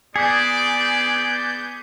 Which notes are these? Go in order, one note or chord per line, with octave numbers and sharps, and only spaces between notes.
B3 G#4 D5 D6 G6 B6 C#7